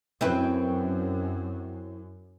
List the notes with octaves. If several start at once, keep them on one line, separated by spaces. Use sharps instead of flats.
F#2 C4 E4 B4